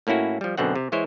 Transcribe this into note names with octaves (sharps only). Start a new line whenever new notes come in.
A2 A#3 C#4 E4 F#4
F3 G3
F#2 B2 D3 C4 F#5
C3
E3 G#3 E4 C5 C#5